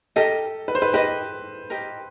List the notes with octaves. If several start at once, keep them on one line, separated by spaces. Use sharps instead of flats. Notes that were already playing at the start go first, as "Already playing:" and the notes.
G4 A4 A#4 D#5
B4
C5
B4
G4 A#4 B4 D#5
G4 A#4 D#5